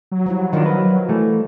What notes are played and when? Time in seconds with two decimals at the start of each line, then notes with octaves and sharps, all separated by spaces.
0.12 F#3
0.26 F3 G3 E4
0.53 D#3 F3 D4 A#4 D#5 F#5
0.66 B4
1.09 E3 A3